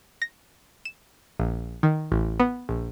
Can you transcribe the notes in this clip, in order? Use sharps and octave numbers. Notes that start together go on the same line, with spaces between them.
A#6
E7
A#1
D#3
A1
B3
A#1